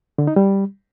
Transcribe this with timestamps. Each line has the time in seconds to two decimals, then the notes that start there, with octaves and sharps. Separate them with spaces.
0.18 D3
0.27 D#4
0.36 G3